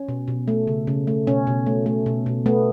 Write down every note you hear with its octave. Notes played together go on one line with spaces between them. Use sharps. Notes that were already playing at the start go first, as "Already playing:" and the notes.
Already playing: C#4
B2
B2
A3
C#3
C#3
A3
B2 C#4
B2
A3
A3
B2
B2
A3 B3